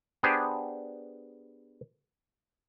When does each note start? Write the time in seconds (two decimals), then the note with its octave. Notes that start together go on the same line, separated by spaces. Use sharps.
0.23 B3 D4 G4 G#4 C5